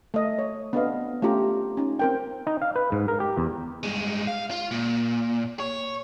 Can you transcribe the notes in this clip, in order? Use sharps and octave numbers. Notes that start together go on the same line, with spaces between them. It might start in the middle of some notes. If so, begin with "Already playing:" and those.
A3 D#5
C#5
B3 C4 D4 A4 D#5 F5
A3 C#4 F4 G4 A#5
C#4 D#4
C4 A#4 G5
D#4
F5
B4
G#2
A#4
G4
E2
G2 G#3
F5
F4
A#2
C#5